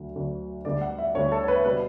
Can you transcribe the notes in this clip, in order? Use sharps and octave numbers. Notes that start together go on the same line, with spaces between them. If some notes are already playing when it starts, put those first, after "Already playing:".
Already playing: D2 D3 F#3
D2 D3 F#3
D2 D3 G3 D5
F#5
E5
D2 D3 G3 C#5
A4
C#5
B4
B2 G3 B4